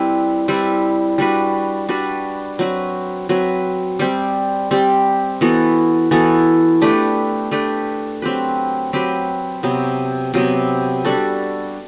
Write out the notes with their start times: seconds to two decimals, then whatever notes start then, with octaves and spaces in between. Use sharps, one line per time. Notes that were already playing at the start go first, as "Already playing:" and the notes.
Already playing: G3 C4 E4 B4
0.48 G3 C4 E4 B4
1.18 G3 D4 F#4 B4
1.89 G3 D4 F#4 B4
2.59 F#3 C4 F#4 B4
3.29 F#3 C4 F#4 B4
3.99 G3 C4 G4
4.71 G3 C4 G4
5.41 E3 B3 F#4 A4
6.11 E3 B3 F#4 A4
6.81 A3 D4 G4 B4
7.51 A3 D4 G4 B4
8.22 F#3 C4 G4 B4
8.93 F#3 C4 G4 B4
9.63 C3 F#3 B3
10.34 C3 F#3 B3
11.05 G3 D4 F#4 A4